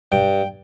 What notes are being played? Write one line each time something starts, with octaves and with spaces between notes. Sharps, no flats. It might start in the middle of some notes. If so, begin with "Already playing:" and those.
G2 G5